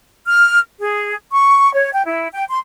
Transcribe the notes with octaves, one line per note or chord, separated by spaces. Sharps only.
F6
G#4
C#6
C#5
G5
E4
G5
C6